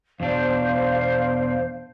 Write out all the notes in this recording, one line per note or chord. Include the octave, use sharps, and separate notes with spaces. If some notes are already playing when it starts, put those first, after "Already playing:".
E2 B2 D4 C5 F5